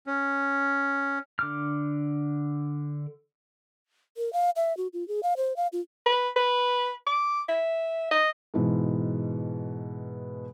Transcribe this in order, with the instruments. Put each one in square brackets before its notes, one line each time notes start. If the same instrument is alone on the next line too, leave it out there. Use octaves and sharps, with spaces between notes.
[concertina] C#4
[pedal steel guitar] D3 D6 F6
[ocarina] A#4
F5
E5
F#4
F4
G#4
F5
C5
F5
F4
[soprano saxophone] B4
B4
D6
E5
D#5
[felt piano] G#2 B2 E3